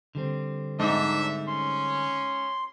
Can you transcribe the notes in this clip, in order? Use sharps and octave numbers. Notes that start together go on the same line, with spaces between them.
D3 G3 C4
G#2 D4 D#4 E5
C#4 C6